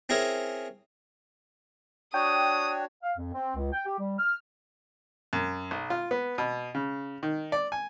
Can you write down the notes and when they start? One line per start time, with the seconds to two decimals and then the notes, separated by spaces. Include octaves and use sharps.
0.09 C4 C#4 E4 G#4 A#4
2.14 D4 F#4 C#5 G5 D#6
3.03 F5
3.18 F2
3.34 C4
3.56 C#2
3.73 G5
3.86 G4
3.99 G3
4.19 F6
5.33 F#2
5.71 B1
5.90 F4
6.11 B3
6.38 B2
6.75 C#3
7.23 D#3
7.52 D5
7.72 G#5